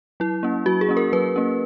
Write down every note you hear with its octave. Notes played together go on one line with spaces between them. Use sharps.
F#3 E4
A#3 C#4
F#3 F#4
G#4
A#3 C#4
A#4
F#3 B4
A#3 C#4